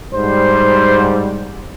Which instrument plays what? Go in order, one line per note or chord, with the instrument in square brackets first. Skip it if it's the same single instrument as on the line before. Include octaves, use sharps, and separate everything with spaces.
[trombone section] G#2 G3 [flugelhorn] C5